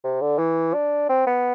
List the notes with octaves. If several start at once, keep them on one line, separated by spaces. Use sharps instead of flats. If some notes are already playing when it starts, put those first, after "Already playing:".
C3
D3
E3
D4
C4
B3